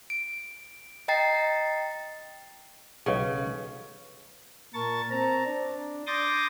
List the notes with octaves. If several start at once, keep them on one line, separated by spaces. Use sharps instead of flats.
D7
D#5 G5 A#5 A6 C7
B1 C#3 F#5 G5
A#2 A#4 A5 C#6 A6
C4 A5 A#5
D4
C6 D6 D#6 G6 A6 A#6